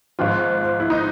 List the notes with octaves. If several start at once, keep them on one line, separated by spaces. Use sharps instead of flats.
G#1 G#2 F3 F4
E4
D#4